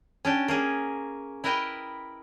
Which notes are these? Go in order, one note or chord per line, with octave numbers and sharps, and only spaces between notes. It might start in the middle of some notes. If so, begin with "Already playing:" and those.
C#4 D4 G4
A#3 C#4 G#4
E4 A#4 B4 D#5 G5